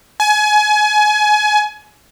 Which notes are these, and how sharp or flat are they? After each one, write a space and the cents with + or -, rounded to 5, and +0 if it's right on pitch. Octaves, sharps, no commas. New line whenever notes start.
G#5 +25